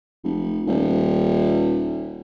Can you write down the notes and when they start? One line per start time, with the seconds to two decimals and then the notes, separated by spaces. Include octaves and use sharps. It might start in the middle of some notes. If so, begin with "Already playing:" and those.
0.24 F1
0.67 D#1